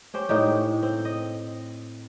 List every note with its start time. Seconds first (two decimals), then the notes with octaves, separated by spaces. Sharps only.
0.14 C#4 G4 C5
0.29 A2 D#4 G4
0.83 C4
1.05 D#5